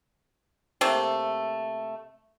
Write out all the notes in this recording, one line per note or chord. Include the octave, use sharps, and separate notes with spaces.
C3 A3 A#3